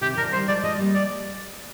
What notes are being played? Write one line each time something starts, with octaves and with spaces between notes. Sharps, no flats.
C3 D#3 G4
D3 F3 A#4
D#3 G3 C5
F3 G#3 D5
F3 G#3 D#5
G3 A#3
D5